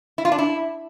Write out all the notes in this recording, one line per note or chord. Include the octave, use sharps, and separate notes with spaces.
E4
F4
D4
E4